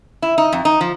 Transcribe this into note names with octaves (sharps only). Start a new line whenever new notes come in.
E4
D#4
F2
D#4
F3